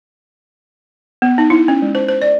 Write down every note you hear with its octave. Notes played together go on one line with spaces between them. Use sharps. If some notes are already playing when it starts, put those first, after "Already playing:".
B3
D#4
E4
C#4
G#3
C5
C5
D5